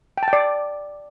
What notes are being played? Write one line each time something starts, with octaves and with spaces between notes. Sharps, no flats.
G5
A5
G5
D5